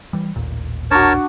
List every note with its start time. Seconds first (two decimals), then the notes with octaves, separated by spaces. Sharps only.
0.13 E3 G3
0.36 A1 D#2 A#2
0.91 D4 F#4 A#4 C#5 A5